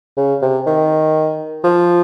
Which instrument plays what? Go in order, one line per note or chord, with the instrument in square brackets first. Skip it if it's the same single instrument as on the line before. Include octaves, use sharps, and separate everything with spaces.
[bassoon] C#3
C3
D#3
F3